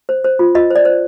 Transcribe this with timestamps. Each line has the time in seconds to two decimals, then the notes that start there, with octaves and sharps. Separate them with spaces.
0.09 C5
0.24 C5
0.39 F4
0.55 F4 D#5
0.70 C5
0.76 D5
0.85 C5